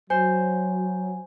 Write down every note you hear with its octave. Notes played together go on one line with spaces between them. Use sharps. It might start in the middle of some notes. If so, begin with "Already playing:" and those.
F#3 C5 G#5